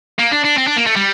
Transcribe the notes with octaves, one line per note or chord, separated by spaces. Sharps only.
A#3
D4
D4
C4
D4
A#3
A3
G3